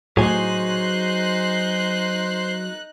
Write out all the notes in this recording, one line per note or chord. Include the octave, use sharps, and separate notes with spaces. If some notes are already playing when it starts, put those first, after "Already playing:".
A2 F#3 D#4 G#4 C5 C6 F#6